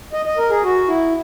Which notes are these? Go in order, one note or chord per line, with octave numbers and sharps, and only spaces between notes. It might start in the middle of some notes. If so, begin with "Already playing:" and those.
D#5
D#5
A#4
G#4
F#4
E4